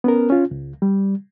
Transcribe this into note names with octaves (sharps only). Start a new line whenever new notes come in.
B3 C#4 A#4
C#4 F4
C#2
G3